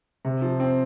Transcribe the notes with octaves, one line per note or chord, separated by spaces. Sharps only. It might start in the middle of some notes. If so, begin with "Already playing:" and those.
C3
F3
C4